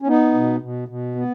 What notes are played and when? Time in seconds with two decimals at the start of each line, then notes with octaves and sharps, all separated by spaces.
0.02 C#4
0.07 B3 D#4
0.34 B2
0.62 B2
0.88 B2
1.15 B3